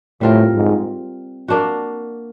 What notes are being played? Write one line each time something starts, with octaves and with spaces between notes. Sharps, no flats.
A2 G3 C4 F4 A#4
G#2
A#3 D4 F#4